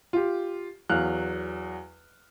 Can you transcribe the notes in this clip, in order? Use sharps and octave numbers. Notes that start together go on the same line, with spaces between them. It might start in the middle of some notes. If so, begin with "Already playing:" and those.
F4 G4
E2 F#3 F5 F6 F#6